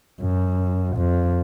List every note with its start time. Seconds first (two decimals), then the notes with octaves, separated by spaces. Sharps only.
0.21 F#2
0.96 F2